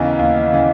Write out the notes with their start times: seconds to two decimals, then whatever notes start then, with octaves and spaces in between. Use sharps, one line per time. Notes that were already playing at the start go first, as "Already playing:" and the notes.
Already playing: D#2 C#3 E3 B3 D#4
0.19 D#2
0.53 C#3 E3